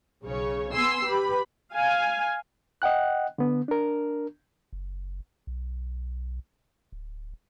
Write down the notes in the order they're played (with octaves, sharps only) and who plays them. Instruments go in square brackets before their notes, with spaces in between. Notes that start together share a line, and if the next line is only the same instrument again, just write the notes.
[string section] B1 C#3 C#5
B3 G#5 C6 E6 C7
G4 B4 B5
[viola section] F5 G#5
[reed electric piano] D#5 F#5 G5 F#6
D3 B3
D4 A#4
[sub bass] F#1
B1
D1